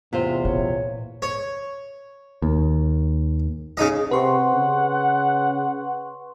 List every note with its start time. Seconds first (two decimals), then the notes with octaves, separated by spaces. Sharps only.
0.13 E2 C3 F4 C5
0.45 A#2 C#5
1.22 C#5
2.42 D#2
3.77 C#3 D#4 D#5
4.11 C3 B4 F#5 C6 C#6
4.54 C#3